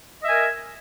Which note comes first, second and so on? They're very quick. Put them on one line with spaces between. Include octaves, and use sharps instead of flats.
D#5 E5 G#5 A#4